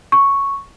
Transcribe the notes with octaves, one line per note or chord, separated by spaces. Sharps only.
C#6